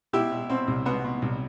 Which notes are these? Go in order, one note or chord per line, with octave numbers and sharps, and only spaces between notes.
B2 E4 G4
B2
B2 C4
C2
B2 B3
B2
C2